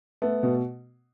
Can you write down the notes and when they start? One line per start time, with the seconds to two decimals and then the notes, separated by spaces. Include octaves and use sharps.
0.22 A3 B3
0.43 B2